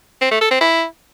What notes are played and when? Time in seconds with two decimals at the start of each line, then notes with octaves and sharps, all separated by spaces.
0.22 C4
0.31 A3
0.41 A4
0.51 C4
0.61 E4